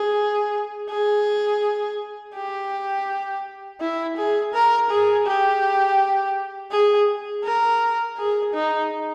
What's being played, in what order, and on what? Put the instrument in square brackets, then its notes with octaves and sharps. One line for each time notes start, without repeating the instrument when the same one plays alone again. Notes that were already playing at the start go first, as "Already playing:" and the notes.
Already playing: [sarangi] G#4
G#4
G4
E4
G#4
A#4
G#4
G4
G#4
A#4
G#4
D#4